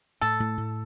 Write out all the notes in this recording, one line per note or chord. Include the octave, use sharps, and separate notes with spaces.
A2 A4
A2
A2